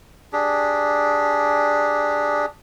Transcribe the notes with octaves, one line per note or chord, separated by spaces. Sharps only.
D4 G4 G#4